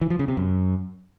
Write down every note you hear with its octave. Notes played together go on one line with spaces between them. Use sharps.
E3
F3
C#3
C3
F#2